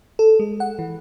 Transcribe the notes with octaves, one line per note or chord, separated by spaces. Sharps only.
A4
G#3
F#5
E3